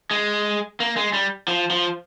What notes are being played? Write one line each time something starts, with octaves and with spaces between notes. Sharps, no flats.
G#3
A#3
G#3
G3
F3
F3